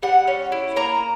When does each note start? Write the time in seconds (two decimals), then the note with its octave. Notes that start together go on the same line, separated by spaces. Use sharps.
0.03 G3 F#5
0.27 C#4
0.52 E4
0.76 A#3 A#5